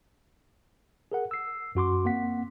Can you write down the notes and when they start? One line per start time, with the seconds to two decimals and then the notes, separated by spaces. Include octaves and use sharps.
1.12 G#4 A#4 F#5
1.31 E6 C7
1.75 F#2 F#4 C6 D6
2.05 A#3 C4 F#5 B6